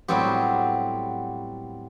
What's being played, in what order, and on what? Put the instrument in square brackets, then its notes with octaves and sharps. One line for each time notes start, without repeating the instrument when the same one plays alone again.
[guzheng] A2 F#3 G3 B3 C4 G4